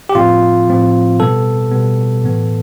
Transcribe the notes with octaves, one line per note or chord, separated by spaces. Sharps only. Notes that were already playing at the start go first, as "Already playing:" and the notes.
G4
A2 F3 C4 F4
A2 F3 C4
B2 G3 B3 A4
B2 G3 B3
A2 E3 B3